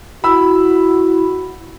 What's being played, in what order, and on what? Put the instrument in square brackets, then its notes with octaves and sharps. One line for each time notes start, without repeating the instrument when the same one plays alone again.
[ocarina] E4 [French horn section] F#4 [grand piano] B5 E6